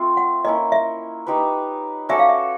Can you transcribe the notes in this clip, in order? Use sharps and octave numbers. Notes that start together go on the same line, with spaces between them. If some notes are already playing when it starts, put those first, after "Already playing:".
Already playing: A3 C4 F4
F#5
A#3 C#4 E4 D#5
E5
D#4 G4 B4
C#4 F#4 A4 D5 E5
F5
E5